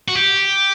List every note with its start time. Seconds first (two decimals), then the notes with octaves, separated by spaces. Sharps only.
0.08 F#4
0.15 G4